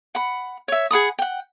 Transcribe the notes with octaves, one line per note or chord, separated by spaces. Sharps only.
F#5 B5
C#5 E5
G#4 F#5 B5 D#6
F#5 G5